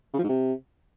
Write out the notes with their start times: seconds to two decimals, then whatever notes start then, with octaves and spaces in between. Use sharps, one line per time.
0.14 C#3
0.19 F3
0.24 G#2
0.29 C3